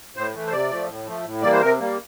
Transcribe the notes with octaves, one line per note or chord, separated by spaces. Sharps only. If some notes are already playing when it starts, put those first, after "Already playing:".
A2 C5
E3 A3
C5
C3 D5
F3 A3
A2
F3 A3
A2
E3 G3 A#3 D5
C5
C3 A#4
G3 A#3